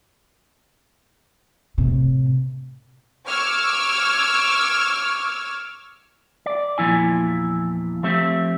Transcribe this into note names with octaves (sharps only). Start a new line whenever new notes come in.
A2 C3
C#6 D6 E6 F6 G#6
D5
E2 A#2 F3 E4 G#5
F3 A3 C4 G4 E5